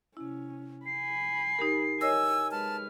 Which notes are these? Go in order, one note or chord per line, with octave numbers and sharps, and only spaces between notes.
C3 C#4 E4
G#5 B5 C7
D#4 G4 A#4
A#4 C#5 D#5 G#5 E6
G#3 B4 A5 F6